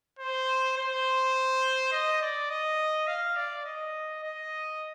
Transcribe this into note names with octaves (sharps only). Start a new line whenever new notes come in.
C5
C5
D#5
D5
D#5
F5
D5
D#5
D#5